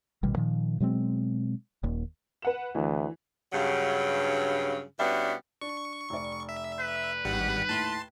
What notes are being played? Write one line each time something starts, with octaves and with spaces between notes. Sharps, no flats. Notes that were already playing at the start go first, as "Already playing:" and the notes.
A1 B2 D#3 G3
A#2 D#3 F3
B2 F#3 G#3 C4
D#1 D#2
B4 F#5 E7
D2 E3
G2 C#3 F#3
B2 G3 B3 C#4 D4 E4
D4 C#6
F1 D5
E5
B4
G#1 G2 D#3 G3 F#5
D#2 A2 A5 C6